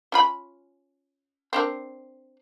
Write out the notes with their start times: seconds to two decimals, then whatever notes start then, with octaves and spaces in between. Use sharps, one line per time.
0.12 C#4 F4 B5
1.53 C4 D4 A#4